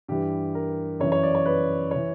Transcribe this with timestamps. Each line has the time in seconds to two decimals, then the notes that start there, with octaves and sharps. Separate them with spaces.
0.08 G2 E3 G4
0.55 A#4
0.99 F#2 E3 C#5
1.12 C#5
1.23 D5
1.35 C#5
1.46 B4
1.91 E3 C#5